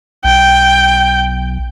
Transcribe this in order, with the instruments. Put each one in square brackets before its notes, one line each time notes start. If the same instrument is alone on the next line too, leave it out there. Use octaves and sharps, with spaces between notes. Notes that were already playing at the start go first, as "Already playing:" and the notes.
[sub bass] B1 [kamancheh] G5